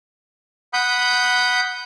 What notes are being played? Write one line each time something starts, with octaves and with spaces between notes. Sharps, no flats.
F#5 B5 D#6 G6